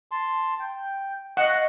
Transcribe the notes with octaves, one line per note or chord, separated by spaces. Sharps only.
A5 C6
G5
D#5 F5 F#5 C#6